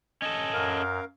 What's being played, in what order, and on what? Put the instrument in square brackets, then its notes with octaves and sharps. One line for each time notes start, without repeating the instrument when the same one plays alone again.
[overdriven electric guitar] C#4 A4 [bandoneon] D#5
[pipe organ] F#2 [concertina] A#4 F5